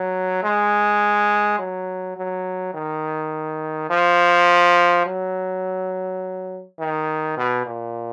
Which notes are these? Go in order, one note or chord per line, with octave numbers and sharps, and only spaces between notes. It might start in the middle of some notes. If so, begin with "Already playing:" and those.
Already playing: F#3
G#3
F#3
F#3
D#3
F3
F#3
D#3
B2
A#2